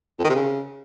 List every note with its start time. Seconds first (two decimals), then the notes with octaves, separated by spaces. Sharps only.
0.19 F2
0.24 D#3
0.30 C3
0.35 C#3